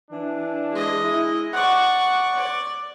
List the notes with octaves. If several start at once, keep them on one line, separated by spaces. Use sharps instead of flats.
E3 D4
G#3 D#5
E4
D5 F#5 C#6
D5